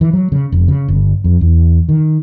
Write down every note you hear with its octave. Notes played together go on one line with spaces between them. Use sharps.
E3
F#3
C#3
F1
C#3
G1
F2
E2
D#3